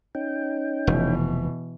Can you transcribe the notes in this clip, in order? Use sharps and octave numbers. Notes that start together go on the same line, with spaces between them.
C#4 D#4 G5
F1 B2 E3